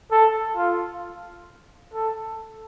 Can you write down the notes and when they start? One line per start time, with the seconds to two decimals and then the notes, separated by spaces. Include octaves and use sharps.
0.12 A4
0.57 F4
1.94 A4